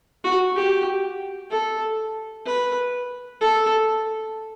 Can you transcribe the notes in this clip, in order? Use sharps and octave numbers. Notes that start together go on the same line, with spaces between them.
F#4
G4
A4
B4
A4